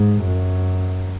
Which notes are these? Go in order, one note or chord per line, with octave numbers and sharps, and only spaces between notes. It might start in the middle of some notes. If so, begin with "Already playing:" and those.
Already playing: G#2
F#2